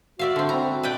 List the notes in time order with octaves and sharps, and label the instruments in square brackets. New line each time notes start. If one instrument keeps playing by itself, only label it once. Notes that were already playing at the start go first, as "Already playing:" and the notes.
[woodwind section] F#4 [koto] D5 E5 F5
[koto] D3 C4
[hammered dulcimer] C4 B5 [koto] A#5
[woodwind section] B2 [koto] B4 D5 G5